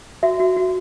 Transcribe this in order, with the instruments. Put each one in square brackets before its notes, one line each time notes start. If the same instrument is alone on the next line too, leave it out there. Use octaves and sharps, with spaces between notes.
[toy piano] F#4 E5
F#4
F#4